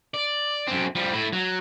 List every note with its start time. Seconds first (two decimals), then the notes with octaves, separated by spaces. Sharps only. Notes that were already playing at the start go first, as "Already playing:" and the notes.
0.14 D5
0.67 F#2 C4
0.95 F3 G3
1.12 A2 E4
1.33 F#3